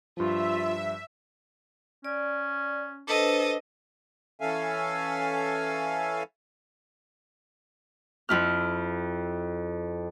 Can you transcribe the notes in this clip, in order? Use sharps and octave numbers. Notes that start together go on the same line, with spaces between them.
G2 F3 F4 E5
C#4 D5
D4 A4 B4 C5 D#5
E3 C#4 A4 E5 F5 G#5
F2 E4 F6